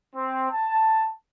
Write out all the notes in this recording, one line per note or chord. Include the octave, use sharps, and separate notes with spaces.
C4
A5